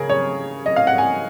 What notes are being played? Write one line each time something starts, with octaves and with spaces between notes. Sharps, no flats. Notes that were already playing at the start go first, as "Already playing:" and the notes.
Already playing: C#3 G#4 A#4
C#5
D#5
F5
F#5
G#5